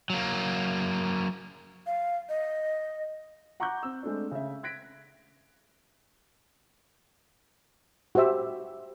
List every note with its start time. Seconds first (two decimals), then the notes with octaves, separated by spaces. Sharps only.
0.10 F#3 A#3
1.86 F5
2.29 D#5
3.60 F#5 A#5 C#6 D6 F#6 G6
3.83 C4 E6
4.03 G#3 A3 C4 D4
4.31 C#3 E5
4.63 F#6 G#6 A#6 B6 D7
8.15 F#4 G4 C5 E5 E6